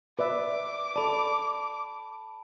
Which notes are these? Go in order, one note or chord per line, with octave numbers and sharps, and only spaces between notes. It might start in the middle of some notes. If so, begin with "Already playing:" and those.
B4 D5 E5 D6
A4 D5 A5 B5